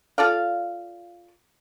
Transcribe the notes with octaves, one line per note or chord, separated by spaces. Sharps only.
F4 A4 D5 F5